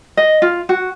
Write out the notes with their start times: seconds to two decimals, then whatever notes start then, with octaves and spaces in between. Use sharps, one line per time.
0.17 D#5
0.42 F4
0.69 F#4